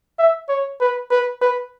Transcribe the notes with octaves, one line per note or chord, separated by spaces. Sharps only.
E5
C#5
B4
B4
B4